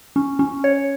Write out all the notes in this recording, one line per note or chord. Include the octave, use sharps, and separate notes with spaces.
C#4
C#4
C#5